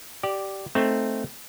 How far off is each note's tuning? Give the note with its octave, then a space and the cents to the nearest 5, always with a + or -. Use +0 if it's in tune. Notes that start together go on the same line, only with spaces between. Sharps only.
G4 -15 D5 +0
A3 +0 C4 +0 D#4 +0